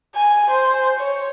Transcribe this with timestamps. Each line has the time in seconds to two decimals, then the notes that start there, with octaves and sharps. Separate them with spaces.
0.15 G#5
0.51 C5
0.98 C#5